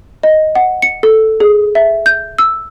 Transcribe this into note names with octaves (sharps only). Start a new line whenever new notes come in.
D#5
F#5
C#7
A4
G#4
E5
G6
E6